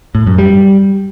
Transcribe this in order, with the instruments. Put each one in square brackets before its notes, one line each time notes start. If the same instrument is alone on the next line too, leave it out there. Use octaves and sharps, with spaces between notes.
[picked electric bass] A2
F#2
G3